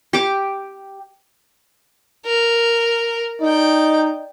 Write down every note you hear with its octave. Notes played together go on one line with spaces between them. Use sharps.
G4 D6
A#4
D#4 D5 G5